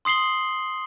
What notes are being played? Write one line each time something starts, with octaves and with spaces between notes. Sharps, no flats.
C6 D#6 C7 F#7 G7